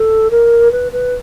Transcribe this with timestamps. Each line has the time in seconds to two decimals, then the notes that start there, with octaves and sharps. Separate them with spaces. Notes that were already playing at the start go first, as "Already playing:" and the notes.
Already playing: A4
0.30 A#4
0.71 B4
0.92 B4